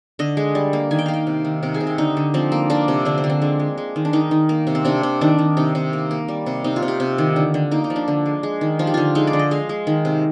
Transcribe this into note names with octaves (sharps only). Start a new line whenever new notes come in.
D3 D#5
G#3
G3
A#3
D#3 G#5
G5
A#3 F5
G5
C3
D#3
C3 A#4
G#4
C3
G4
D3 D#4
D3
F3 C4
A#3
A#3 D4
C3
D3 D4
C4
D3
C4
G#3 D4
G#3
G#3
D#3
D4
D#3 D#4
D#3
A#3
C3
C4
C3 D4
C3
D#3 D4
D#3
C3 D#4
C3
A#3
A#3
G3
C3
C3 D#4
F4
C3
G4
C3
D#3
D3
D3
A#3 D#4
D#4
F3
D4
D3
G#3
G#3
D#3
F3 F4
G4
D3 F4
G#3 D#4
D5
D3
D#5
G#3 F5
G#3
D#3
C3